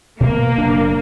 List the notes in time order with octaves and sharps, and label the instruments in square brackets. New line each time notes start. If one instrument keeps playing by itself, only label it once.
[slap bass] B2 [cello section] A#3
[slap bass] F#1 D4